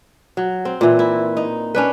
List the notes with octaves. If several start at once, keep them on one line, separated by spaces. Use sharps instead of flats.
F#3
C4
A#2 E3
E4
D#4
C#4 D4 B4